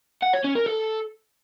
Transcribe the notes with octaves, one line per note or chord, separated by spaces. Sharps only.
F#5
C#5
C#4
A#4
A4